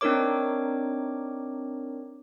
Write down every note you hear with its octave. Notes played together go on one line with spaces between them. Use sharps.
C4 D4 D#4 A#4 C#5 D6